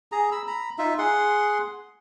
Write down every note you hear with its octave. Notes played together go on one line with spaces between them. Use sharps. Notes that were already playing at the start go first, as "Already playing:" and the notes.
G#4 A#5
B5 E6
A#5 B5
D#4 F4 E5
G#4 F#5 C6